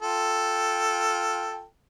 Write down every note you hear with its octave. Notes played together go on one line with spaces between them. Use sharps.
F4 A4 G5